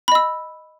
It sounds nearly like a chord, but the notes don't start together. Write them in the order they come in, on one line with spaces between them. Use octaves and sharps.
B5 D#5 E6